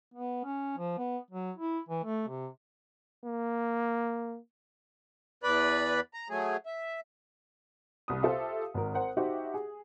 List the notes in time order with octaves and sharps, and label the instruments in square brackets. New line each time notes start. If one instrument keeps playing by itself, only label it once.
[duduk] B3
C#4
F3
B3
F#3
E4
E3
A3
C3
[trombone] A#3
[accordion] E2 B4 D5 B5
A#5
F#3 A3 G#4
E5
[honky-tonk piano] C2 D#6
F4 G4 A4 C5 E5 F5
G#1 A#4
A#4 C5 F#5
D#4 F#4 G4 C5 E5 F#5
G#4